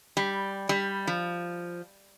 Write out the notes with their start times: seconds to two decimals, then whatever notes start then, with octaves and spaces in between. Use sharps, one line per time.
0.17 G3
0.69 G3
1.07 F3